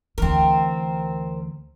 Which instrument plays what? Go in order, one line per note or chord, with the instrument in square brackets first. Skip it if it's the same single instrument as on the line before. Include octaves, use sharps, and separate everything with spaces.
[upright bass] D2 E3 [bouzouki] C4 A#4